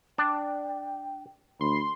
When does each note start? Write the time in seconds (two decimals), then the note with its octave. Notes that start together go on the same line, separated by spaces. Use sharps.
0.18 D4 D5 G5
1.61 D2 B5 C6